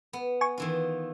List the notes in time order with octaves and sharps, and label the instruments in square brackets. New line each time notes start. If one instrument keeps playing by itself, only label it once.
[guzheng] B3
[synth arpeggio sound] G#5 C#6
[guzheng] D#3 E3 F4